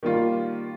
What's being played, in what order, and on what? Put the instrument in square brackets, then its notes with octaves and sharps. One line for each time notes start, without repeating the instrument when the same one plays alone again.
[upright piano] D#3 G3 A#3 F4